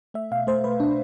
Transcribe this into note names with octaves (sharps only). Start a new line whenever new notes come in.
A3 E5
B2 F5
A3 C5
A3 B4
B2 D4